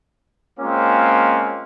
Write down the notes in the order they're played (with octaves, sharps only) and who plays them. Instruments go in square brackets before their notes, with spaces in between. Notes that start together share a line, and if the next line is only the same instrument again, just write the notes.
[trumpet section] G#3 A#3 C4 C#4 F4